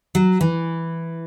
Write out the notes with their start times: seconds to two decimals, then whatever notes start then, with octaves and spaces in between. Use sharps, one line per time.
0.15 F#3
0.41 E3